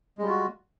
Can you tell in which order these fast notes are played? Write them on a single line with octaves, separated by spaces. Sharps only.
G#3 G3 F4 F#4